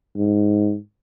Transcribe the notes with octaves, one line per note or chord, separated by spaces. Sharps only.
G#2